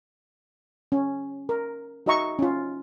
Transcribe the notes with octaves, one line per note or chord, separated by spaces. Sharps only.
C#4
A#4
D#4 F#4 D#5 E5 A#5 C#6
C#4 F4